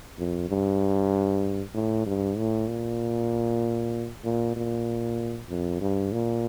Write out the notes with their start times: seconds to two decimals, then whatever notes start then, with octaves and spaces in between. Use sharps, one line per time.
0.19 F2
0.50 G2
1.74 A2
2.06 G2
2.37 A2
2.68 A#2
4.25 A#2
4.56 A#2
5.50 F2
5.81 G2
6.12 A#2